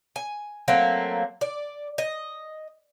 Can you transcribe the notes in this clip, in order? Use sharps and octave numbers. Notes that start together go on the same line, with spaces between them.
G#5
F#3 A3 A#3 C4
D5
D#5